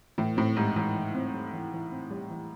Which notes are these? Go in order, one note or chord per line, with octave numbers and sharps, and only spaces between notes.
A2 E3
A2 C4
G#2 G3
G#2 E3
E3
C4
G3
E3
E3
C4
G3
E3